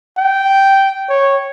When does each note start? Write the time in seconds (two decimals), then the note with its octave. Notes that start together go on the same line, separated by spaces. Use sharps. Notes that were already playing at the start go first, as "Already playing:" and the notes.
0.18 G5
1.09 C#5